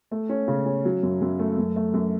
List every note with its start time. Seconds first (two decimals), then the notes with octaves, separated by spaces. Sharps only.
0.11 A3
0.29 C#4
0.48 C#3
0.66 C#4
0.85 F#3
1.03 F#2
1.22 F#2
1.39 A3
1.58 F#2
1.76 A3
1.94 F#2